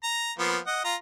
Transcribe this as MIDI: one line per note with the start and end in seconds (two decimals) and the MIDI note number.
0.04 0.32 82
0.39 0.58 53
0.39 0.58 58
0.39 0.58 59
0.67 0.80 75
0.67 0.80 78
0.85 0.95 65
0.85 0.95 82